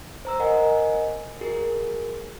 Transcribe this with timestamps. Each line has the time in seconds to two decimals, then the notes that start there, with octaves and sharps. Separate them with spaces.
0.25 C5 A#5 E6
0.40 A#4 D#5 F#5 G#5
1.41 F#4 G#4 A#4